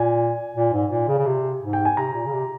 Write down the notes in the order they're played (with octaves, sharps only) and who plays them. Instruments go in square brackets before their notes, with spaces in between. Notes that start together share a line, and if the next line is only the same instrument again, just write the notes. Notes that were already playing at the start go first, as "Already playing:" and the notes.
Already playing: [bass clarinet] A#2 [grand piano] G#5
[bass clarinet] A#2
G#2
A#2
C#3
C#3
C3
G#2
[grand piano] G5
G#5
[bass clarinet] C3 [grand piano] A#5
[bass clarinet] A#2
C#3
C3